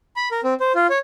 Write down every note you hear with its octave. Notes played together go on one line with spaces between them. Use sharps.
B5
A#4
C4
C5
F4
C#5